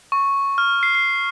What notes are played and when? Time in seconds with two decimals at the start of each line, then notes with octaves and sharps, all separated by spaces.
0.12 C#6
0.58 F6
0.83 C7
0.95 C7